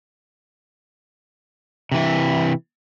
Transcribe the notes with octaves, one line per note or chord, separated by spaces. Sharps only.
C3 E3 E4